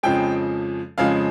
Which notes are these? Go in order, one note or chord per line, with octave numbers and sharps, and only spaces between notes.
F2 C#3 F3 G#3 G5
F2 C#3 F3 G#3 F5